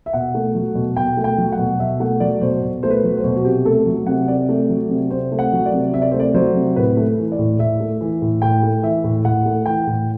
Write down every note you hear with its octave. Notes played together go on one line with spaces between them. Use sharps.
E5
B2 F#5
A3
F#3
B2
B2 G5
A3
G5
F#3
F#5
B2
B2 E5
A3 F#5
F#3 D5
B2 C5
B2
A3 C5
B4
F#3
C5
B2
F#4
C3 G4
A3 A4
F#3
C3 F#5
C3 D5
A3
F#3
C3
C3 C5
A3
F#5
F#3
D5
C3
C3 E5
D5
A3 C5
D5
F#3 C5
C3
A2 B4
A3
E3
D5
A2
A2 E5
A3
E3
A2
A2 G5
A3
E3 E5
A2
A2 F#5
A3
E3 G5
A2